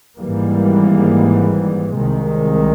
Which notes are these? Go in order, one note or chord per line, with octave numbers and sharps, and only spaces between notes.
G#1 G#2 E3 G3 A#3
C2 C3 D#3 G#3